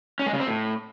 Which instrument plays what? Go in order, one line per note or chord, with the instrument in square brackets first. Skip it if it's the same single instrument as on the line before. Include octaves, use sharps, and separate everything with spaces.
[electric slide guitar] C#4
G#3
C#3
C4
A2